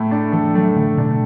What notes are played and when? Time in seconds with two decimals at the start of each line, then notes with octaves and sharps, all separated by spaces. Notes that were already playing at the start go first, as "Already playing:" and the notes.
Already playing: A2 A3
0.11 D4
0.32 E3 A4
0.55 F#3 A3
0.76 A2 D3
0.97 B2 D4